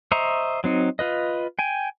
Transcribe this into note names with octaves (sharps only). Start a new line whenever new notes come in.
C5 D#5 E5 A#5 C#6
F#3 C4 D#4
F4 B4 D#5
G5 G#5